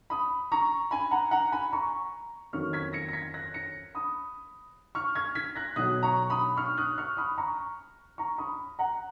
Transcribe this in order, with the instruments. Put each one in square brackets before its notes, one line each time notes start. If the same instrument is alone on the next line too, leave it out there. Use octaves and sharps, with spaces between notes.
[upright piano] B5 D#6
A#5 C#6
G#5 B5
F#5 A#5
F#5 A#5
G#5 B5
A#5 C#6
F2 D#3 F#3 A#3 C#4 C#6 F6
G#6 B6
A#6 C#7
A#6
G#6 B6
F#6 A#6
A#6 C#7
B5 D#6
C#6 F6
F6 G#6
G#6 B6
F#6 A#6
B1 B2 F#3 D#6 F#6
A#5 C#6
B5 D#6
C#6 F6
D#6 F#6
C#6 F6
B5 D#6
A#5 C#6
A#5 C#6
B5 D#6
F#5 A#5